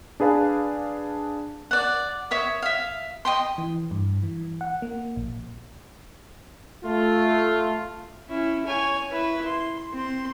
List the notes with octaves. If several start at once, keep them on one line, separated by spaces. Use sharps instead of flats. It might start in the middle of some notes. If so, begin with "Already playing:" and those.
D4 G#4 B4 F5 A5
D5 F#5
C#5 E5 D#6
E5 F5
D#5 G5 C6
E3
G2
E3
F#5
A#3
A#1
A3 F4
C#4 E4
C#5 G#5
E4 B4
C6
C4 C6